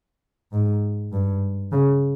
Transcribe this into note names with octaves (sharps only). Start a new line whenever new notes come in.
G#2
G2
C#3